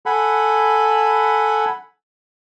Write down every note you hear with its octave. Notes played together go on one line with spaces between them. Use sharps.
A4 F#5 G#5 B5